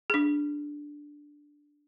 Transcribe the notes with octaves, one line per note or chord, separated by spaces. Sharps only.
D4 G#4